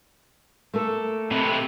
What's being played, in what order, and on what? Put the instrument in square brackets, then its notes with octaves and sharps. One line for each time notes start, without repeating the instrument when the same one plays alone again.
[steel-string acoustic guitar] A3 A#3 A4
[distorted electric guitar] C3 B4 [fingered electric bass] C4